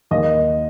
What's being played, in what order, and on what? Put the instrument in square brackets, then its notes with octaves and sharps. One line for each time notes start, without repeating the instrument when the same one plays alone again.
[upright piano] D#2 D#5